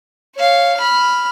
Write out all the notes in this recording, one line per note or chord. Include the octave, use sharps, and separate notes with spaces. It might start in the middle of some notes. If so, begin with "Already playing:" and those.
C#5 F5
B5 F6